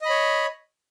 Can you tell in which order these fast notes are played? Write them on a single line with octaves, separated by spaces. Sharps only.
D#5 B5 C#5